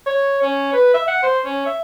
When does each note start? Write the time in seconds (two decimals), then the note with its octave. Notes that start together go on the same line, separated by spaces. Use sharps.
0.06 C#5
0.42 C#4
0.73 B4
0.94 E5
1.08 F#5
1.23 C5
1.45 C#4
1.66 E5